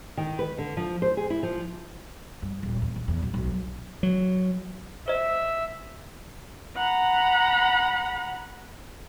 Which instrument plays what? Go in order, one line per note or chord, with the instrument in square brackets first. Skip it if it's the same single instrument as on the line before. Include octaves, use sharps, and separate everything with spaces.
[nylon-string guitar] D#3
B4
D3
F3
C5
G#4
E4
F3
[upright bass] G2
D#1
E2
D#2
E2
B1
B1
F#3
[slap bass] F#3
[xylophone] C5 D#5 [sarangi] E5
[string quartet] F#5 A#5 B5